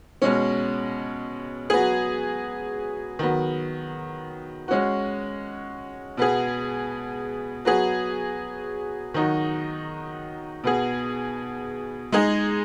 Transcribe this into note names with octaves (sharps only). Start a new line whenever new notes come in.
B2 G#3 C#4
F#3 B3 G#4
D#3 F#3 B3
G#3 C#4 F#4
B2 B3 G#4
F#3 B3 G#4
D#3 F#3 D#4 F#4
B2 B3 G#4
G#3 D#4 G#4